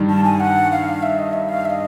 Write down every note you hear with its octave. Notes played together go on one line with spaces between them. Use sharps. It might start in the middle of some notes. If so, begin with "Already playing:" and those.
Already playing: G2 D#3 G3
A5
G#5
F#5
F5
E5
D#5
E5
F5
E5
D#5